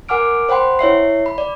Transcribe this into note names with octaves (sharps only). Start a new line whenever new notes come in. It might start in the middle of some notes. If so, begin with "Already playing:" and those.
A#4 F#5 G#5 D6 F6 D7
C5 F#5 G5 B5 C6
E4 C#5 E5 C7
B5
D5